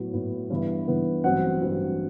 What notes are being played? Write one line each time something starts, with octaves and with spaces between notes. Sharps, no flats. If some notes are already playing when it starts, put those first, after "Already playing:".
Already playing: A2 F#3 B3
A2 F#3 B3
G2 E3 B3 E4
G2 E3 B3 E4
A1 G2 F#3 C4 F#5
A1 G2 F#3 C4